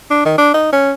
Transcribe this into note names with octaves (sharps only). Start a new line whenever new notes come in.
D4
D#3
D4
D#4
C#4